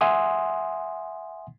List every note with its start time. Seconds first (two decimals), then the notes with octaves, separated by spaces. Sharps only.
0.01 E5 F#5 G#5 C6 D#6